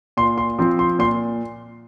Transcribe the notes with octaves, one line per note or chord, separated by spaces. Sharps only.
A#2 C6
C6
F3 C4 C6
C6
A#2 C6